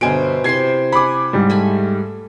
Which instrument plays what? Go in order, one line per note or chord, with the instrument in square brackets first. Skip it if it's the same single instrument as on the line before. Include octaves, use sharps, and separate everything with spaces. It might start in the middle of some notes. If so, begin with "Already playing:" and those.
[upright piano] G1 G#5 D7 [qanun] B2 C5
[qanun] C3 E4 C6 [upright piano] G#6 C7
[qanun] F#5 G#5 [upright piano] B5 D6
[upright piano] G#2 G3
[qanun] A3 G#5 B5